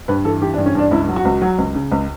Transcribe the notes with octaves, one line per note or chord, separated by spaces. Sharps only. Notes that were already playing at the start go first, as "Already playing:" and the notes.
G2 B4
E3 A4
E3 G4
D4
G2
C#4
G2 D4
C#2 E4
F#3
F#4
C#2
F#3
C#2
C#3
C#2